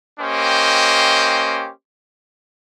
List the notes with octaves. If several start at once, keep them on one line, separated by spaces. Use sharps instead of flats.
A#3 C#4 G4 C5 D#5 G5